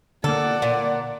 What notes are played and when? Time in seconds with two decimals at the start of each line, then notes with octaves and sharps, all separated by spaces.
0.24 D3 A#3 A4 D5 F#5
0.62 A#2